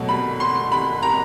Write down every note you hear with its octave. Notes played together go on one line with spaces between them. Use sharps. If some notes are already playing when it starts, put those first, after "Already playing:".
Already playing: B2 F#3 A3
B5
C6
B5
A#5